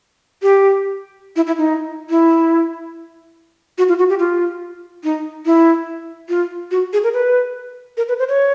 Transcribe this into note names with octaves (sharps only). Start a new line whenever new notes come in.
G4
E4
E4
D#4
E4
F#4
F4
F#4
G4
F4
D#4
E4
F4
F#4
G#4
A#4
B4
A#4
B4
C5
C#5